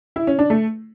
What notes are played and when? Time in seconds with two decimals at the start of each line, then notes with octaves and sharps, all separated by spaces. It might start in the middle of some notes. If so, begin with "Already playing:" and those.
0.16 E4
0.27 C#4
0.39 D4
0.50 A3